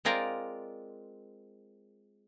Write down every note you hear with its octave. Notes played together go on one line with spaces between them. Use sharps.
G#3 C4 F4 A#4 D5